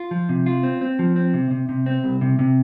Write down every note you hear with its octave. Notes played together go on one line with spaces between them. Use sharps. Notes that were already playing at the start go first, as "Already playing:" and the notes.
Already playing: F4
F3
C3
F4
C4
C4
F3
C4
C3
C3
C3
C4
C2
C3
C3